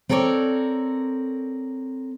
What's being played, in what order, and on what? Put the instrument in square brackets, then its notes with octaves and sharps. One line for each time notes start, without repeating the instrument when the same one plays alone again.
[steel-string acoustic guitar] C4 A4 A#4 C#5 D5